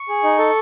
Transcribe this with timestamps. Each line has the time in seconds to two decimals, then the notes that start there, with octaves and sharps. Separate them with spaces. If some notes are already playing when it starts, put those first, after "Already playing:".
Already playing: C#6
0.09 G#4
0.24 D#4
0.39 A4